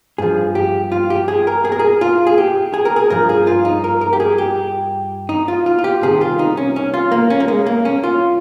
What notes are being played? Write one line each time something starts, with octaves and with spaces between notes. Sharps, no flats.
G2 F3 G#4
G4
F4
G4
G#4
A#4
G#4
A#4
G#4
F4
G#4
G4
G#4
A#4
G#4
G2 F3 A#4
G#4
F4
D#4
A#4
A#4
G4
G#4
G4
D#4
F4
F4
F4
G4
C2 C3 D#3 G#4
F4
D#4
C#4
C#4
F4
A#3
C#4
A#3
G#3
A#3
C#4
F4